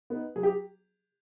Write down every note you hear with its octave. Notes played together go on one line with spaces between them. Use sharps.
B3 D#4
F#3 G#4
G4